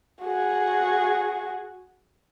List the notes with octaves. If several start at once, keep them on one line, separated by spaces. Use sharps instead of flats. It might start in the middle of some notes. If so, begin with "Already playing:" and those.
F#4 G#4